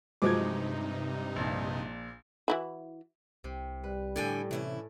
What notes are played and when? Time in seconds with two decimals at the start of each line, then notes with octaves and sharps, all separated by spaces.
0.22 G2 C3 F3 F#3 G#3 D#4 D6 G#6
1.36 A#1 A#2
2.48 E3 E4 F#4
3.44 C2 C3
3.84 G3 B4
4.16 A2 D3 D5 G5 G#5
4.51 C3 E3 C#4 E4